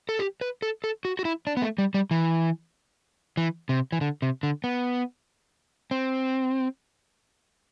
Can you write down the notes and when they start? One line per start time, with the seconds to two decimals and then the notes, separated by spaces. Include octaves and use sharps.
0.09 A4
0.19 G4
0.41 B4
0.62 A4
0.84 A4
1.05 F#4
1.19 F#4
1.25 E4
1.47 D4
1.57 B3
1.62 A3
1.78 G3
1.94 G3
2.11 E3
3.37 E3
3.69 C3
3.92 E3
4.01 D3
4.22 C3
4.43 D3
4.64 B3
5.91 C4